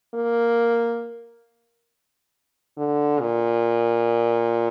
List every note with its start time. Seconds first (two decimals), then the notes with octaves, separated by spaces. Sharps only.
0.14 A#3
2.78 D3
3.21 A#2